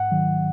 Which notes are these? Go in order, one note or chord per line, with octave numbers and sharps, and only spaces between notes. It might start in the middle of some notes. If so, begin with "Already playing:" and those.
Already playing: G#2 F#5
D#3 F#3